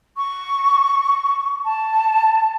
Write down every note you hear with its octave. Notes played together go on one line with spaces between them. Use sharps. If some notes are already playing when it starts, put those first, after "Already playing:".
C#6
A5